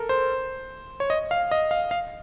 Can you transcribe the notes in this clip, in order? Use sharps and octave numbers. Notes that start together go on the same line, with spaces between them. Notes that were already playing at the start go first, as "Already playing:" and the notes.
Already playing: A4 A#4
C5
C#5
D#5
F5
D#5
F5
F5